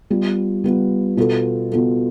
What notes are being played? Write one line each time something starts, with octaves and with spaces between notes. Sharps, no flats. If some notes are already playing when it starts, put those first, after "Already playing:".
G3 B3 F4
G3 B3 F4
B2 B3 F4 A4
B2 B3 F4 A4